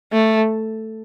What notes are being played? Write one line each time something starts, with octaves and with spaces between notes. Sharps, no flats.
A3